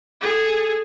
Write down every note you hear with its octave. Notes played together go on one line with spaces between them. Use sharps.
G#4 A4